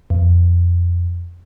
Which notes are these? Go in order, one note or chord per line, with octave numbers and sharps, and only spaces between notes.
F2